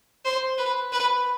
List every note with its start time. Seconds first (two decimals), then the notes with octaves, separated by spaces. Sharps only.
0.25 C5
0.58 B4
0.92 B4